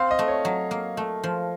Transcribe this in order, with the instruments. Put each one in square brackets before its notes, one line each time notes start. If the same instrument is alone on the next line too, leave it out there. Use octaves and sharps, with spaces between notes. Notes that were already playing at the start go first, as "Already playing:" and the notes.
Already playing: [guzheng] C4 [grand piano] F5
[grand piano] D#5
[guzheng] A3
[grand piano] C#5
[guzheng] F#3
A#3
A3
F3